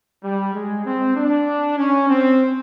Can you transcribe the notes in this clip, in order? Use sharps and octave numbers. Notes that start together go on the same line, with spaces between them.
G3
G#3
C4
D4
C#4
C4